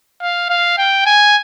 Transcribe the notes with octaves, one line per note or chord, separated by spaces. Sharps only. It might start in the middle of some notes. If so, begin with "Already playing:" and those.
F5
F5
G5
G#5